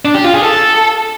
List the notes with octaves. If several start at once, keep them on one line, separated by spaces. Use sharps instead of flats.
D4
G4
F4
G#4
A4